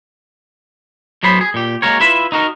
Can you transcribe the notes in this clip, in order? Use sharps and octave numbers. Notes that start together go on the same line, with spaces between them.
A2 F#3 B3 C5 B5
G#4
A#2 G4
G#3 A#3 F#4 A#4 C#5
E4 F4 B4 E5
D#4 F#4 A#4